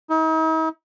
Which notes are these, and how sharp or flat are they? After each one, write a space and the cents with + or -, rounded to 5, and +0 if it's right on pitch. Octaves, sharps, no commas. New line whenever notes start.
D#4 +45